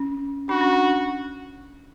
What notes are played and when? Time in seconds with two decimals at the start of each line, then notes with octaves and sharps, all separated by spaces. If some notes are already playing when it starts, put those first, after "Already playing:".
Already playing: C#4
0.49 D4 F#4
0.61 C#4
0.73 D4